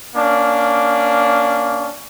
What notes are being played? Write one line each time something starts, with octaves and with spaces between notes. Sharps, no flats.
A#3 C#4 D4